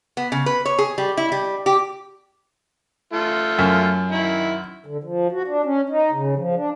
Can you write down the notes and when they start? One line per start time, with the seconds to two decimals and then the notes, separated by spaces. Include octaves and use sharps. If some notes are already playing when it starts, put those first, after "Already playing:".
0.17 B3
0.32 C#3
0.46 B4
0.66 C#5
0.79 G#4
0.98 G3
1.17 E4
1.32 G3
1.66 G4
3.13 A3 F4
3.59 F#2
4.12 D#3 E4
4.86 D3
5.04 F3
5.32 F#4
5.47 D4
5.65 C#4
5.89 D#4
6.12 C#3
6.36 F3
6.55 D4